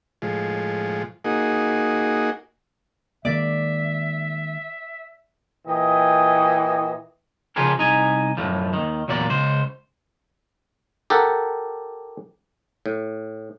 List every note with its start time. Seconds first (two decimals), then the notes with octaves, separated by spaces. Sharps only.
0.22 A2 F3 G#3
1.24 A#3 D#4 F#4 G#4
3.25 D#3 G#3 A#3 D5 E5
5.67 A#2 E3 G4 D#5
7.56 C#3 F3 F4 G4 G#4 A#4
7.78 C2 D#4 G#5
8.37 F#2 A2 F3
8.73 D#2 D#3
9.08 E2 A#2 F#3 A#3 D5
9.30 C#2 C5
11.10 G4 A4 A#4 F#5
12.86 A2